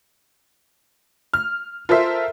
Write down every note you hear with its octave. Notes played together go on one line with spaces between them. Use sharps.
F6
F4 A4 A#4 C5 E5